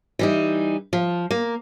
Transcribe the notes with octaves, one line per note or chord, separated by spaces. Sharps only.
E3 G3 D#4
F3
A#3